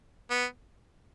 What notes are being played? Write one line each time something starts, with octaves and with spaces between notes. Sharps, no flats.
B3